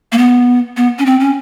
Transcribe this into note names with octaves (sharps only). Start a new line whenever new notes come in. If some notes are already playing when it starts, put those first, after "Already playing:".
A#3
B3
B3
C#4
C4
C#4